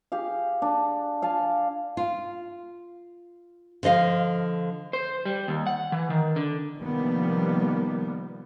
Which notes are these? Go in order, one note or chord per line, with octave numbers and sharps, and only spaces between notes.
G4 G#4 F5
D4
F5 G#5 A5
F4
D3 F3 D#5 F5
C5
G3
D#2
F#5
E3
D#3
D3
C3 D#3 F3 G3 A#3 B3